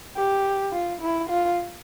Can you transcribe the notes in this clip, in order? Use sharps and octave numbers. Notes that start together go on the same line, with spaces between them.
G4
F4
E4
F4